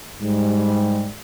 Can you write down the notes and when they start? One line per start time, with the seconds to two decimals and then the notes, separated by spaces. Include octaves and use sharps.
0.20 G#2 G3